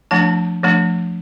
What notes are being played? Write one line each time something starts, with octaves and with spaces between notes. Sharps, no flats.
F3 A3 D4 A5
F3 A3 D4